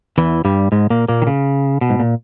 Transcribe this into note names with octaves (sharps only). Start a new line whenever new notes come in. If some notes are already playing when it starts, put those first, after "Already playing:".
E2 E3
G2 G3
G#2 G#3
A#2 A#3
A#2 A#3
D#3
C#3
B2
G#2
A#2